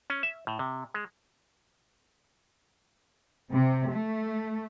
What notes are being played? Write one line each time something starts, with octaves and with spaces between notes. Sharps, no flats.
C#4
E5
A2
C3
G#3
C3
A3